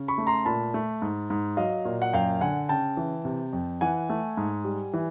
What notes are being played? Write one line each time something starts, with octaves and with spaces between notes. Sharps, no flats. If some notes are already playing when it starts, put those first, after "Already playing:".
Already playing: C#3
B5 C#6
A3
A#5 C6
A#2 A5 B5
A3
G#2
G#2
F#3 D#5 F5
A#2
F#5
F#2 F5 G5
D3 F#5 G#5
C#3 G5 A5
E3
C3
F2
E3 F#5 G#5
A3
G#2
G3
E3